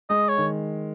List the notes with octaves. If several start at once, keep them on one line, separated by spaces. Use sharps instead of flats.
G#3 D#5
C#5
D#3